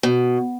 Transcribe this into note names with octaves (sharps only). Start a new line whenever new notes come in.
B2